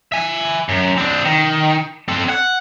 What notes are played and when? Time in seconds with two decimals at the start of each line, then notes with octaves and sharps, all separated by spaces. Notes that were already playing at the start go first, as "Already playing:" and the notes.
0.12 E5 G#5
0.69 F#2
0.98 C4 D4
1.25 D#3
2.08 C4 A4
2.29 F#5